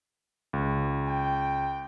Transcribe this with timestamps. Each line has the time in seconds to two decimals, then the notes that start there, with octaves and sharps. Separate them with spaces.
0.53 C#2
1.08 G5